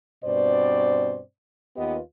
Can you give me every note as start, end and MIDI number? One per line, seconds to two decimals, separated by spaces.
0.24 1.19 43
0.24 1.19 47
0.24 1.19 60
0.24 1.19 72
0.24 1.19 74
1.77 1.97 39
1.77 1.97 59
1.77 1.97 65
1.77 1.97 67
1.77 1.97 71
1.77 1.97 75